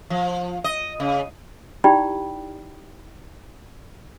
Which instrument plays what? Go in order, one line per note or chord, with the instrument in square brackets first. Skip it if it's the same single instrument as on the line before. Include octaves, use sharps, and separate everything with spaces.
[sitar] F3
D#5
C#3
[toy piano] D#4 E4 G4 D5 G5 B5